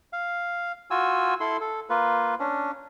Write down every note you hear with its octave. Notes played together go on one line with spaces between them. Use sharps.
F5
F4 F#4 G#5 E6
E4 A4 C6
A4
A#3 F4 B4
C#4 D4